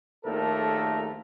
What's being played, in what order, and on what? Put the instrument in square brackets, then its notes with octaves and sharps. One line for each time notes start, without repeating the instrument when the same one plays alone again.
[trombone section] A#1 D#2 A3 A4 A#4